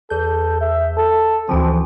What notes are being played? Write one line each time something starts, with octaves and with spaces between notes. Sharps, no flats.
E2 A4 G6
E5
A4
D2 E3 F3 C4